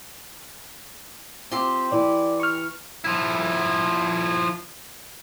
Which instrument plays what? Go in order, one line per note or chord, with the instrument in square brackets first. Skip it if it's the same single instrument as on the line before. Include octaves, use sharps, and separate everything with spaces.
[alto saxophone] C4 [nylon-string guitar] F4 [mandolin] G4 C6
[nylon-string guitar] E3 E4 [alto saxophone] D5
[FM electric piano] C#6 F6
[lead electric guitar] F3 E4